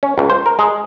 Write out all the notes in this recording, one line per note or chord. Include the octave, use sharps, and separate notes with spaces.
C#4
C#2
C5
A#4
G#3